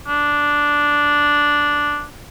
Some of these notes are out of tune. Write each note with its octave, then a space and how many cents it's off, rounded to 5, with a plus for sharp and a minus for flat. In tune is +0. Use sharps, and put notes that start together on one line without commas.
D4 -5